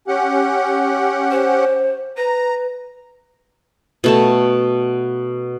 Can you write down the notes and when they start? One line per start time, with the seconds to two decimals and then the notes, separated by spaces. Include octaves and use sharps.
0.08 C#4 G4 F#5
1.31 C5
2.17 B4 A#5
4.04 B2 A3 A5